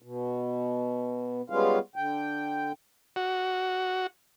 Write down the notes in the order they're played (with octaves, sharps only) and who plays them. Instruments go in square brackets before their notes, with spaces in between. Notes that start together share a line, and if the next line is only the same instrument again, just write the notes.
[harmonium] B2
G3 G#3 B3 C#4 F4 F5
D3 G5
[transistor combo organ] F#4